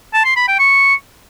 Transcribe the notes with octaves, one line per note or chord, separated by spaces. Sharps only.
A5
C6
B5
G5
C#6